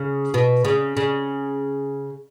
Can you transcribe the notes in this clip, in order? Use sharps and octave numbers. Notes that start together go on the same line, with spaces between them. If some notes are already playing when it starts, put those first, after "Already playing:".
Already playing: C#3
B2
C#3
C#3